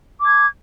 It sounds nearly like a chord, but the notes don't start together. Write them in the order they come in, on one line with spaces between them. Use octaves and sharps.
D6 A5 G#6